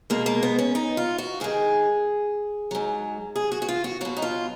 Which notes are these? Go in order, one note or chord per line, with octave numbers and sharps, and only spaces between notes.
B2 G#3 A#3
A#3
B3
C#4
D#4
F4
F#4
G#2 D#3 G#3 G#4
G#2 F#3
G#4
F#4
F#4
F4
F#4
B2 F#3 F#4
D#4
F4